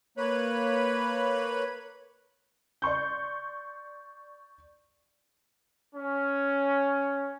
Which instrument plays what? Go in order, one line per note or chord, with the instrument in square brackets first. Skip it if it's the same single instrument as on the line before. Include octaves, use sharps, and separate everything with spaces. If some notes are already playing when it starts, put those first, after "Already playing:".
[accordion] A#3 B4 C#5 B5
[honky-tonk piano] D5 C6 C#6 G6
[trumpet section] C#4